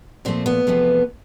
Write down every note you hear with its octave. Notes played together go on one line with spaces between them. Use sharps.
A#2 F3 A3 C4
B3
E2 C3 F3 A3